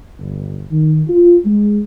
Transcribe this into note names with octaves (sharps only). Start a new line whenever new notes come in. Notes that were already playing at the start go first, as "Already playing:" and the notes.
G1
D#3
F4
G#3